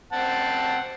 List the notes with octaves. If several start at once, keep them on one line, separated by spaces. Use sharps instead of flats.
C4 F#5 A5